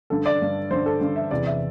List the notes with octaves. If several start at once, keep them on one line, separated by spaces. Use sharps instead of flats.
G2 D3 A4
D5
G2 D3
G2 D3 C5
A4
G2 D3
E5
E2 C3 E3 D5
E5